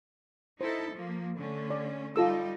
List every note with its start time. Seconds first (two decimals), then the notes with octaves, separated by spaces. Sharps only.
0.61 D#4 E4 A4 C5
0.93 F3 A#3
1.37 D3 A3 C#4
1.70 D5
2.16 G3 D#4 F4 A4 E6